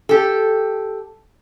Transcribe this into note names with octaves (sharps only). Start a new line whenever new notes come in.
G4 A4